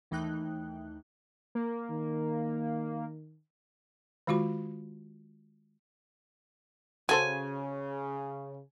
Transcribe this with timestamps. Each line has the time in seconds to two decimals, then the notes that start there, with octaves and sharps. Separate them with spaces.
0.11 D#2 E3 A3 D#4 G5 F#6
1.55 A#3
1.91 D#3
4.27 D#3 G#3 F4 F#4 B5
7.09 C#3 F#4 A4 C5 G#5